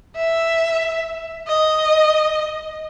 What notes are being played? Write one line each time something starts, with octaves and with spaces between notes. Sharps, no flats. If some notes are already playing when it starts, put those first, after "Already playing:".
E5
D#5